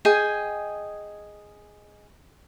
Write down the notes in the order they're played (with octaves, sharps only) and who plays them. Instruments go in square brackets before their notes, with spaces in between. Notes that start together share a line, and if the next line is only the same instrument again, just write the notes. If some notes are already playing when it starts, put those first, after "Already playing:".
[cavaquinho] G#4 D#5 G5 G#5